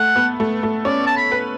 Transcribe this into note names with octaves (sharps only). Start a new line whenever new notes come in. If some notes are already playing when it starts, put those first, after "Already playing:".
Already playing: A3 F#5
B3
A3
A3
C#4 D5
A5
B5
B4